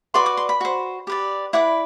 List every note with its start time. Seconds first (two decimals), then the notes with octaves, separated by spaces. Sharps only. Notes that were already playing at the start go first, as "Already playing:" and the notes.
0.14 F#4 B4 D5 C6
0.26 D6
0.37 C6
0.49 B5
0.61 F#4 C5
1.07 G4 B4 D5
1.53 E4 B4 D5 F#5